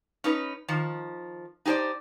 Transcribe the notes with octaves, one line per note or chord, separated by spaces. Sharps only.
C#4 D#4 B4
D#3 F3
D#4 G4 G#4 C5 D5